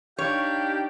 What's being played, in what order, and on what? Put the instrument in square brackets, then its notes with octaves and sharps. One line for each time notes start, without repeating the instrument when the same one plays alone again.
[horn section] D4 D#4 G4 [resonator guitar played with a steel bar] C#5 [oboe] F5 [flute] G6